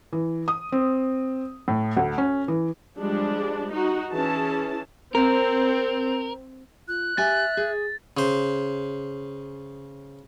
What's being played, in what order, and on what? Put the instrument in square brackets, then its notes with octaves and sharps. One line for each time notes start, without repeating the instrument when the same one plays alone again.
[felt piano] E3
D#6
C4
A2
D2
C#4
E3
[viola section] F3 G3 G#3 D4
D#4 F#4
E3 C#4 G#4 A5
[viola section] C4 [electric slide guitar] A#4
[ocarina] F4 [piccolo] F#6
[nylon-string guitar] G4 G#5 [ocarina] E5 [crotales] A6
[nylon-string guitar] G#4
[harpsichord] C#3 C5